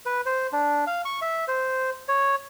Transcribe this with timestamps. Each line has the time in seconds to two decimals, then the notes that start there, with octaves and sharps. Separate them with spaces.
0.06 B4
0.26 C5
0.53 D4
0.87 F5
1.05 C#6
1.22 E5
1.48 C5
2.08 C#5